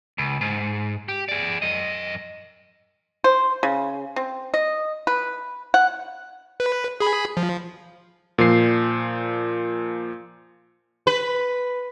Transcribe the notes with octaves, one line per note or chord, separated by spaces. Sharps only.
C#2
G#2
G4
G#4 D5
F#2 D#5
C5
C#3
C4
D#5
B4
F#5
B4
G#4 B5
F3
A#2 F3 C7
B4